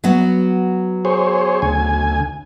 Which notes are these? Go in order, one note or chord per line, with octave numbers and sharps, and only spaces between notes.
F#3 B3 F#4
G#4 C5 C#5
D2 G#5